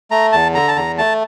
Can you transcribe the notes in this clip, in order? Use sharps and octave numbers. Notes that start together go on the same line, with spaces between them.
A3 A#5
E2 A5
D3 A#5
A5
E2 A#5
A3 A5